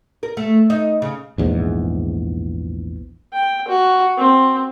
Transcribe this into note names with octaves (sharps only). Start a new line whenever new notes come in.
A#4
A3
D#4
C#3
A#1 E2 G#2
G5
F#4
C4